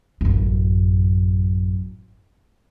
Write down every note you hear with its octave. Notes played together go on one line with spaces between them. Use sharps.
A1 F#2